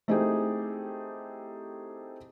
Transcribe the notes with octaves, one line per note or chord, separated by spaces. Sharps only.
A3 C4 D#4 E4 G4 G#4